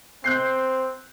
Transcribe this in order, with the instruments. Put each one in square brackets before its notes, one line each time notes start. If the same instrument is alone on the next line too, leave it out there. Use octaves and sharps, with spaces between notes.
[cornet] C4 [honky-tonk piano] F#6 G6 C7